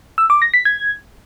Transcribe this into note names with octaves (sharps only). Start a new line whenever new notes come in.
E6
D6
A#6
B6
G#6